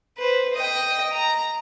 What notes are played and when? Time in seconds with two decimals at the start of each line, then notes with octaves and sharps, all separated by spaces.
0.18 B4 C5
0.54 D#5 G5
1.13 A#5